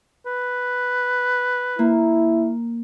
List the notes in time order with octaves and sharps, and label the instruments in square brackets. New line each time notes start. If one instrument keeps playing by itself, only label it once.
[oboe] B4
[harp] A#3 [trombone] E4